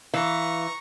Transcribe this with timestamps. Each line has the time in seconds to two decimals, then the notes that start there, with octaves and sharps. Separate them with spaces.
0.14 E3 F5 A#5 C#6